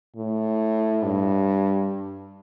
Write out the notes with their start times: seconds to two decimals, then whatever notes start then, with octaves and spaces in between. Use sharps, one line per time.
0.16 A2
1.03 G2